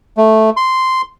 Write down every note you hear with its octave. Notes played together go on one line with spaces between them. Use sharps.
A3
C6